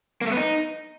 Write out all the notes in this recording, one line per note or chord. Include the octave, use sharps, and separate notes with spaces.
A#3
A3
B3
D#4